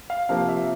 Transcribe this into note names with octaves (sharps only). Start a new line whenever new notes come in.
F5
C3 F3 A#3 F5
E5